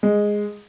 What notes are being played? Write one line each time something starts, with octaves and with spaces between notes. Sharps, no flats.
G#3